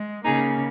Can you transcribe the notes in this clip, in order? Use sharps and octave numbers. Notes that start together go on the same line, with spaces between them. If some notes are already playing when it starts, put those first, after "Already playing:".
Already playing: G#3
C#3 A#3 D#4 G#4